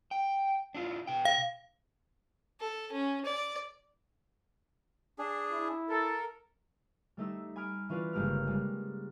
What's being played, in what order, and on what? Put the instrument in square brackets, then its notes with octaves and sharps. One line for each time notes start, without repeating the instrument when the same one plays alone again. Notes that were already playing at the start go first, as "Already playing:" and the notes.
[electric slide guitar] G5
D4 E4 F4
B2 G5
[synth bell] F5
[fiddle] A4
C#4
D5
[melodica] D4 G#4
[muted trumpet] E4
[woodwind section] A4 [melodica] A#4
[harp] G3 A3 D#4 E6
G#5 B5 D#6 F6 D7
E3 C#4 F4 B4 D5
G1 C#3 G#3 A#3 G4 F6
G3 G#3